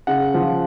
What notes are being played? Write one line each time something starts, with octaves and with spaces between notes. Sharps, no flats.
C#3 F#5
F3